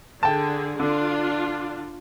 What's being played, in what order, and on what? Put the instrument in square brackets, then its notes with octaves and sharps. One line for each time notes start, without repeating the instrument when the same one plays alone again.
[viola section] D3 G#4 [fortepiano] G5 A5
[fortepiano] D3 [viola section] D4 F4